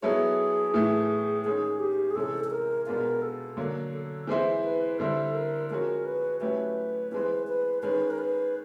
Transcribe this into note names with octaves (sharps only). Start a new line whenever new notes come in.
F#3 B3 E4 G#4 A4 C#5
A2 E3 A3
D#3 G#3 C#4 G#4
G4
G#4
C3 E3 G#3 C#4 A4
A4
A#4
B2 G#3 B3 D4 F4 A#4
A4
D3 F#3 A#3
A4
E3 G#3 C4 E4 C5
B4
D3 G3 C4 E4 A4
A#4
F3 G#3 C#4 F#4 A#4
B4
F#3 A3 C#4 E4 G4 B4
E3 G#3 C4 B4
B4
D#3 G#3 C#4 B4
A#4
B4